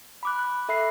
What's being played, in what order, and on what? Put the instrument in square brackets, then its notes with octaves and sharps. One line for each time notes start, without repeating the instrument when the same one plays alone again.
[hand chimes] B5 D6 F#6
F#6
A4 E5 B5 F#6 C7